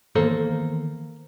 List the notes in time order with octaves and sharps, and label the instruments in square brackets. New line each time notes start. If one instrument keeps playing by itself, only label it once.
[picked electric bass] D#3 E3 B3 [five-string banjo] A#3 A4 C5